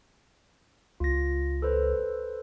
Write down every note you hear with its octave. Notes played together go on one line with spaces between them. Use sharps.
C#2 F4 A#6
A4 B4 C5